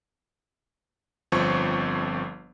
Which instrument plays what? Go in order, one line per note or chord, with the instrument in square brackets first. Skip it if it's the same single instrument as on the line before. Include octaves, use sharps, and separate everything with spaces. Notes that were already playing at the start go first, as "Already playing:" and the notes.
[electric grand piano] G1 F2 F3 C4 C#6